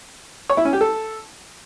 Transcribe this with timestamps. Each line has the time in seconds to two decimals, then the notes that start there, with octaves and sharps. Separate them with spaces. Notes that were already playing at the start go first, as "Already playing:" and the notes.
0.50 C#5
0.57 E4
0.65 C#4
0.73 G4
0.81 A4